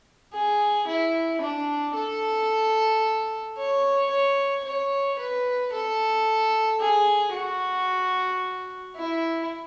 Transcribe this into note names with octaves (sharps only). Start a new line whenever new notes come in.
G#4
E4
D4
A4
C#5
C#5
C#5
B4
A4
G#4
F#4
E4